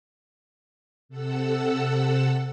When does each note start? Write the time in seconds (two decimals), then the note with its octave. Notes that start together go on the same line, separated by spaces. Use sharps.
1.09 C3 A4 F#5 E6